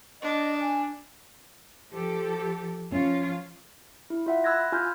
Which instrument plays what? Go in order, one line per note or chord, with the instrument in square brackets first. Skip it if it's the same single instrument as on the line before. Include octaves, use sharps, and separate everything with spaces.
[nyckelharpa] D4 [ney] D#5
[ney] G#5
[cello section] F3 G4 A4
[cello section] F3 F4 C#5 [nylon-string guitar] C#4
[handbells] E4
F4 E5 F#5
B5 E6 F#6 G#6 A#6
F4 G#5 F6 G6